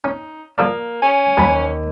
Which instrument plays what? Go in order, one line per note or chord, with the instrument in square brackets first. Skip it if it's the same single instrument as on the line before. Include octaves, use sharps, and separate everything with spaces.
[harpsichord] C#4 [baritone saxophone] D#4
[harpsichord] F3 A4 D5 [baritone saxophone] A#3
[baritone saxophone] C#4 [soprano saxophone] G#5
[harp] D#2 [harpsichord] F#3 A5 B5